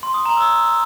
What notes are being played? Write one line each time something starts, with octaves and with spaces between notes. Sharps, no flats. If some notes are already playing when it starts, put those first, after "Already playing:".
C6
D#6
A#5
E6